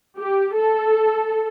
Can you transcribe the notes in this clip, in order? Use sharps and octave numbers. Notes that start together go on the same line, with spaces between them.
G4
A4